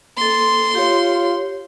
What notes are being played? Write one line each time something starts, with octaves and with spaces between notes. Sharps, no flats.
A#3 A4 C6
F4 G4 C#5